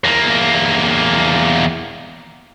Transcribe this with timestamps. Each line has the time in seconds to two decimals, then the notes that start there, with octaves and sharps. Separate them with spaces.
0.04 E2 A#3